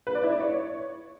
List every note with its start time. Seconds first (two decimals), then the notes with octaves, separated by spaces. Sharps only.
0.07 B4
0.15 D5
0.23 E4
0.32 D5
0.40 C#5